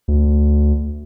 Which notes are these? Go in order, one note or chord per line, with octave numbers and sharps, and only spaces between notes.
D2